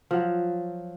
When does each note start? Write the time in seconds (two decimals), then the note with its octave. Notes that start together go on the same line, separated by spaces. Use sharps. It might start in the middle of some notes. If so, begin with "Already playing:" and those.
0.11 F3 F#3